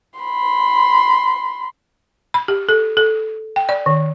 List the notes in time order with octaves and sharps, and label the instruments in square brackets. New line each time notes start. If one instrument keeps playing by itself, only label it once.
[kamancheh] B5 C6
[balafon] B5
G4
A4
A4
G5
D5
D#3